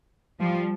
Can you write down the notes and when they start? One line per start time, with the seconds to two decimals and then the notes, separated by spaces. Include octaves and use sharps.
0.41 F3 G3